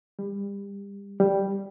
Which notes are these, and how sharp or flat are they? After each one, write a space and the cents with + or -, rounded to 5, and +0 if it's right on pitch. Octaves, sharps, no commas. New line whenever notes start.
G3 +30
G3 +0